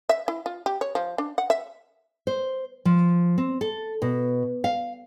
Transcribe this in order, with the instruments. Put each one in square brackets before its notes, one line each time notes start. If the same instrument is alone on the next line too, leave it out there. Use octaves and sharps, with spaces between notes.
[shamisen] E5
E4
F4
G4
C#5
F3
D4
F#5
E5
[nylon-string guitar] C5
F3
C4
A4
B2
F5